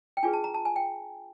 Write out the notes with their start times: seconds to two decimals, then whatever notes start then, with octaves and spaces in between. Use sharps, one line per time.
0.17 G5
0.23 D4 F4 G#4 B4 G#5
0.33 A5
0.44 A#5
0.54 A5
0.65 G#5
0.76 G5